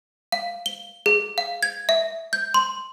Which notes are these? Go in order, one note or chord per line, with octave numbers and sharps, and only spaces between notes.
F5
G7
G#4
F5
G#6
E5
G6
C6